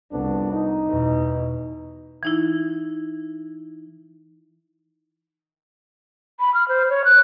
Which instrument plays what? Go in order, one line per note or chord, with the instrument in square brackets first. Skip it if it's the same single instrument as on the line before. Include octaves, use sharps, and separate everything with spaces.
[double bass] C2 [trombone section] F2 B3 D4
[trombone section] D#4
[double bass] E2 B2
[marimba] E3 D#4 E4
[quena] B5
F6
C5
C#5
F#6